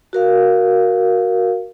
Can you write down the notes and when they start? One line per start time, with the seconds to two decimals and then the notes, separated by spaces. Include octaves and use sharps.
0.13 F#4 A#4 F5